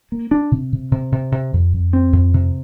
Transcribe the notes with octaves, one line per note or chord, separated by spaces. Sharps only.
A#3
D4
C3
C3
C3
C3
C3
F2
F2
C4
F2
C3